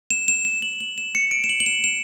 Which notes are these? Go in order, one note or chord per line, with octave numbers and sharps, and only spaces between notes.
E7
E7
E7
F#7
F#7
E7
C#7
D7
E7
F#7
F#7
E7
E7